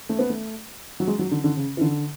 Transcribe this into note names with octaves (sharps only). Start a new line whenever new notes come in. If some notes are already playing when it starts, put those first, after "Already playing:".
A3
B3
A3
F#3
G#3
F#3
D3
D3
C#3
E3
D3